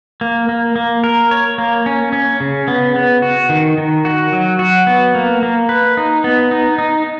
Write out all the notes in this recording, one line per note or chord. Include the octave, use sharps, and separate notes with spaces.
A#3
A#3
A#3
A#4
C#5
A#3
C#4
C#4
C#3
B3
B3
F#4
D#3
D#3
F#4
F#3
F#4
B3
A#3
A#3
B4
D#4
B3
D#4
D#4